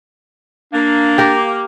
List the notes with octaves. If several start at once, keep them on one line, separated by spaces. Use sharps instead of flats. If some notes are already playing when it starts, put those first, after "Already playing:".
A#3 D4
G4 A#4